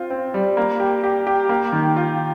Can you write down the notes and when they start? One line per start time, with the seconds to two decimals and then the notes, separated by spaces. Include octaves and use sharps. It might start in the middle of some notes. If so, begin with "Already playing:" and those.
Already playing: C4 F4
0.10 C4
0.34 G3
0.57 A#3
0.80 G4
1.04 G4
1.27 G4
1.49 A#3
1.72 D#3
1.96 F4